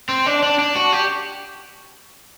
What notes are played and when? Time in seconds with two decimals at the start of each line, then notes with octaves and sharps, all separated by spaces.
0.09 C4
0.26 D4
0.43 D4
0.59 D4
0.75 F#4
0.92 G4